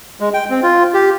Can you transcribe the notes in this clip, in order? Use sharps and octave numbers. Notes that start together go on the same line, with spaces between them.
G#3
G5
C4
F4
G4